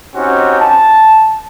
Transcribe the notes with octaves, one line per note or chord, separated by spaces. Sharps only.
C4 C#4 D#4 F#4 G4
A5